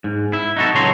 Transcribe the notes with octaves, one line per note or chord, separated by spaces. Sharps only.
G#2
E4
D#4 F#4 A4
C#2 F#3 A4 C#5 A#5 C6